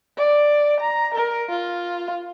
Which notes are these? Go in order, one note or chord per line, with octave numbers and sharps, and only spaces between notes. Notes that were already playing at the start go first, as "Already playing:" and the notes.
D5
A#5
A#4
F4